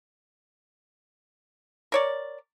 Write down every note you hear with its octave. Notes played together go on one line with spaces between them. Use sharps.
A#4 C#5 D5